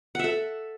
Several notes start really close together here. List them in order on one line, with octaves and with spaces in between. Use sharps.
F#5 E5 A4